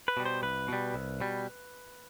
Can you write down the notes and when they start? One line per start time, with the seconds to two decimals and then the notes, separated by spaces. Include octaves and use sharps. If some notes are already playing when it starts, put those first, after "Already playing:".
0.08 B4
0.17 B2 G3
0.25 C5
0.43 C2 B4
0.68 B2 G3
0.94 C2
1.20 B2 G3